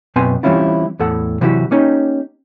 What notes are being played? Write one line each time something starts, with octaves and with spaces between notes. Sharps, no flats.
F#2 B2 C4 B4 G#5 C6
E3 G3 C4 C#4 E4 F4
E2 A2 A4 F#5
C3 E3 F#3 E4 F#4 G4
A#3 C#4 D#4 G4